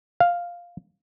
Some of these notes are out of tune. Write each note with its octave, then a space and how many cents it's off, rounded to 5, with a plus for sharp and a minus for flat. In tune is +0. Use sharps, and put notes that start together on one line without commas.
F5 +0